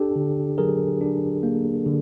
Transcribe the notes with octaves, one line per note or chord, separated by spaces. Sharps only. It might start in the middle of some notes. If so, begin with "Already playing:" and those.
Already playing: D4 G4 A4
D3
F#3 G#4 A#4
D4
A#3
D3